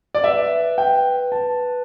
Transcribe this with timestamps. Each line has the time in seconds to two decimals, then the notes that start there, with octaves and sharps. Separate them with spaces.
0.15 D5
0.23 B4 E5
0.78 G5
1.32 A5